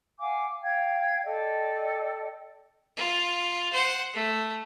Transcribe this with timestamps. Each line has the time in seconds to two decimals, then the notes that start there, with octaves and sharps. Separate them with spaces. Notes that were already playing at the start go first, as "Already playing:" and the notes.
0.19 F5 F#5 G#5 D6
0.62 F5 G5 G#6
1.23 A4 D5 D#5 G5
2.97 F4
3.73 C5 F#5
4.13 A3 E5